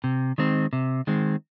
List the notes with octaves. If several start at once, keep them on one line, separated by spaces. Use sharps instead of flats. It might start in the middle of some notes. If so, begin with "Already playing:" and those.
C3
D#3 G#3 C4
C3
D#3 G#3 C4